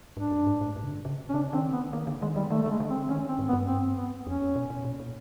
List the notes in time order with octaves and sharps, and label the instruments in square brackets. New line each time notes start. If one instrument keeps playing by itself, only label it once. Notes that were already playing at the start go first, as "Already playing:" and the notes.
[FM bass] G#2 [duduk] D4
[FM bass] G2
G#2
A2
G#2
C#3
D3
C#3
[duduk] C#4
[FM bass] C#3 [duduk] D4
[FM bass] D#3 [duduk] C4
[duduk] B3
[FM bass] D#3 [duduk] A#3
[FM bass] D3
[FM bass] D#3 [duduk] G#3
[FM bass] D#3 [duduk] G3
[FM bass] D#3 [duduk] A3
[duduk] A3
[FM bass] D3 [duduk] G#3
[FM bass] D3
[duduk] C4
[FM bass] D#3 [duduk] C#4
[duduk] C4
[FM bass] G#2
[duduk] B3
[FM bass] G2
[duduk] C4
B3
[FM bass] F2 [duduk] C#4
[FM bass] B2
B2
A#2
A#2